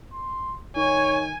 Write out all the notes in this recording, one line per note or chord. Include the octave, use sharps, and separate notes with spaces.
C6
D#3 C#5 G#5